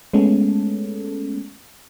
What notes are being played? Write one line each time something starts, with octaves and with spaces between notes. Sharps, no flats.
G#3 A3 B3 C#4 A4